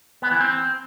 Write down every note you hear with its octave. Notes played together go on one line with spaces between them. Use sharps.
B3
E3
C4